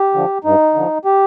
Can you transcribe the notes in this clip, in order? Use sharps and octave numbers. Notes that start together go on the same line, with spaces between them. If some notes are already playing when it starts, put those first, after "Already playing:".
Already playing: G4
D3 F3
G2 D#4
D3 F3
G4